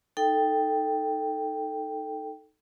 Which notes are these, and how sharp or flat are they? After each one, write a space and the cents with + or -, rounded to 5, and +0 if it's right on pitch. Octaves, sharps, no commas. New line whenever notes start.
D#4 +0 A4 +0 G5 +0